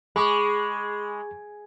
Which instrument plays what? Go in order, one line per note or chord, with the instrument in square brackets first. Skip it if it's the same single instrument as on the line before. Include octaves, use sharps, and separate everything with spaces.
[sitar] G#3 [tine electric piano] G#4 [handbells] B5 C#6 D6